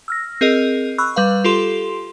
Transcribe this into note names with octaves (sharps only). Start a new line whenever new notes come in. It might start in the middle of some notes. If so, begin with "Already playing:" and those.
E6 F6 A#6
C4 G#4 A#4 D#5
B5 C#6 E6 F#6
G3 B4 F5
F4 G4 A4 C6